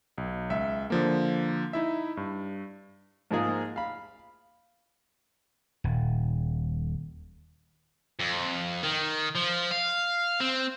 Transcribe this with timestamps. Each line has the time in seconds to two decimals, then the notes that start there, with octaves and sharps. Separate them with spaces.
0.18 B1
0.50 C#2 E5
0.90 D3 F3 A#3
1.73 D#4 E4 E5
2.17 G2
3.31 G#2 F3 G#3 A#3 G#4
3.76 F5 B5
5.84 D#1
8.20 F2
8.83 D#3
9.35 F3
9.71 F5
10.40 C4